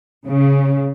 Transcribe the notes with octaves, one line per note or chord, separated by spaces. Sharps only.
C#3